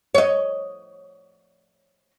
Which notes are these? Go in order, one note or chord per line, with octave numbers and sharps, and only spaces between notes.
C#5 D#5